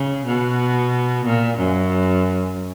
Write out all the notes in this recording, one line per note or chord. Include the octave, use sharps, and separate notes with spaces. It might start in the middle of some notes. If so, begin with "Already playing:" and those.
Already playing: C#3
B2
A#2
F#2